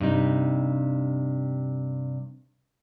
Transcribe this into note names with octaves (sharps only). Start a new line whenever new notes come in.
G2 C3 D#4